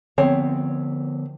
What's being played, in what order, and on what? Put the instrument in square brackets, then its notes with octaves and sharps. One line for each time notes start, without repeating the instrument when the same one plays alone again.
[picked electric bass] D3 F3 B3 [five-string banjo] C4 C#5